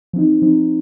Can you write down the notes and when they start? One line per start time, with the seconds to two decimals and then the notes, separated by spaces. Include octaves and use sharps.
0.13 F3 C4 D#4
0.42 F3 C4 D#4